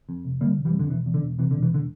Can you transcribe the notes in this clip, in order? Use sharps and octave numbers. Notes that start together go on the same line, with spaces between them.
F2
F1
D3 G3 A#3
F1
E3 G3
F2
D3
E1 E3
E2
D3
E1
C3 E3
D3
E1
E3
D3